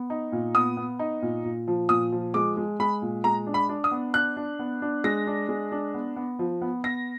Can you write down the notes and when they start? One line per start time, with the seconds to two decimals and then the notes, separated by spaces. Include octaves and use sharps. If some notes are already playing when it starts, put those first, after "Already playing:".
Already playing: B3
0.10 D#4
0.32 A#2
0.55 B3 D#6
0.77 B3
0.99 D#4
1.22 A#2
1.44 A#2
1.67 F3
1.89 A#2 D#6
2.12 F3
2.34 G#3 D6
2.57 G#3
2.80 G#3 B5
3.02 A#2
3.24 G#3 A#5
3.47 D4
3.54 B5
3.69 D4
3.84 D#6
3.91 B3
4.14 D4 F#6
4.37 D4
4.59 B3
4.82 D4
5.04 G#3 A#6
5.27 D4
5.49 G#3
5.72 D4
5.94 B3
6.16 B3
6.39 F3
6.62 B3
6.84 B3 A#6